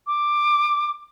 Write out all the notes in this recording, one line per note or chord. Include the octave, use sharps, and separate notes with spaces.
D6